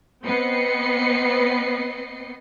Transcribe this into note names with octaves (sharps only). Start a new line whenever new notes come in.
B3 C4 B4 D#5 C7 C#7